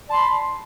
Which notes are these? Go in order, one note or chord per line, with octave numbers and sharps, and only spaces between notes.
D5 A5 B5 C6